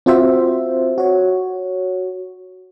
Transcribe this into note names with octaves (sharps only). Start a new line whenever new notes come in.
C4 F4 F#4 C5 E5
F#4 C#5